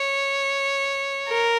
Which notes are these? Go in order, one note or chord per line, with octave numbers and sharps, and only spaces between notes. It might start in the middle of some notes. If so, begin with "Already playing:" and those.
Already playing: C#5
A#4